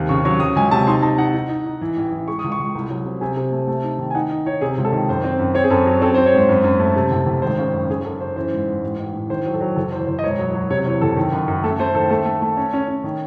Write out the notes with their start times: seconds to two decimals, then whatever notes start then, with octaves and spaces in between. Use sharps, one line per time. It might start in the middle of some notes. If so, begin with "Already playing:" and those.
Already playing: D#2 C3
0.09 C#3 C#6
0.25 F#3 C#6
0.40 F#3 D#6
0.55 C#2 G#5
0.71 C3 A5
0.87 D#4 C6
1.02 D#4 A5
1.18 D#4 F#5
1.34 D#4
1.49 D#4
1.66 D#4
1.81 E3
1.96 A1
2.12 E3
2.27 G#3 C#6
2.39 C#2 D#6
2.52 C#6
2.59 C#2
2.75 C2
2.90 F#3
3.05 C3
3.21 C3 G#5
3.37 C3
3.52 A3
3.67 A3
3.84 D#4
3.99 D#3
4.10 G#5
4.15 D#4 F#5
4.31 D#4
4.46 D#4 C#5
4.61 C3 G#4
4.78 C#2
4.84 A4
4.92 D#3
5.09 F#2 C5
5.24 C4
5.39 F#2
5.55 C4 C#5
5.64 G#4
5.70 F#2 A4
5.86 F#3
6.02 C4 A4
6.14 C5
6.18 C4
6.26 C#5
6.34 G#2 C5
6.49 F#2
6.64 F#2
6.79 A3
6.96 C3
7.11 F#1
7.26 F#1
7.42 G#1 C5
7.58 C#3
7.74 F#2
7.90 C#3 G#4
8.05 F#2 A4
8.20 C#3 C5
8.36 E3 C5
8.52 G#2
8.67 G#2
8.82 A1
8.98 A1
9.14 A2
9.30 D#3 C5
9.45 F#3
9.54 A4
9.61 F#3
9.76 F#1 A4
9.92 E2 C5
10.07 F#1 C5
10.19 D#5
10.23 E1 C#5
10.38 F#3
10.55 F#3
10.70 C3 C#5
10.85 E2 C#5
11.01 F#1 A4
11.16 D#3
11.32 F#2
11.48 F#2
11.64 A3 A4
11.79 A3 C5
11.95 D#3 A4
12.10 A3 A4
12.26 A3
12.42 A3
12.57 C#4
12.73 C#4
12.88 C#4
13.04 D#3